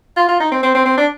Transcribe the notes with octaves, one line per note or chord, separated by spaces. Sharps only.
F4
F4
D#4
C4
C4
C4
C4
D4